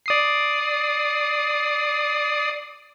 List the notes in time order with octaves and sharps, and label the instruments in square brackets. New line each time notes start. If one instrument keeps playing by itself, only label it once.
[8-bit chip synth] D5 D#6 C7